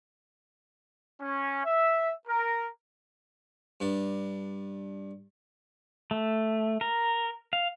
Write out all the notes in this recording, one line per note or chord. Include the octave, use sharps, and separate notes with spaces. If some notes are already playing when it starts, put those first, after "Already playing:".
C#4
E5
A#4
G2 D4
A3
A#4
F5